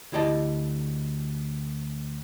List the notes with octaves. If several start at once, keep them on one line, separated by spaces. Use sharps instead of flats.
D2 E4 G4 D#5 A5